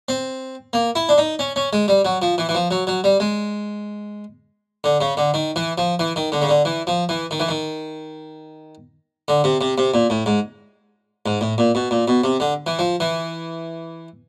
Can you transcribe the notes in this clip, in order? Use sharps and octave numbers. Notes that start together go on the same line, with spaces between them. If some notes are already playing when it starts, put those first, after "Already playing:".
C4
A#3
E4
D4
D#4
C#4
C#4
G#3
G3
F#3
F3
E3
E3
F3
F#3
F#3
G3
G#3
D3
C#3
D3
D#3
E3
F3
E3
D#3
D3
C#3
D3
E3
F3
E3
D#3
E3
D#3
D3
C3
C3
C3
A#2
A2
G#2
G#2
A2
A#2
B2
A#2
B2
C3
D3
E3
F3
E3